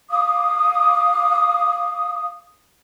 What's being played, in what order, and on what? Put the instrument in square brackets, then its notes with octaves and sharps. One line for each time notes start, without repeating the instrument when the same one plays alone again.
[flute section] F5 D6 D#6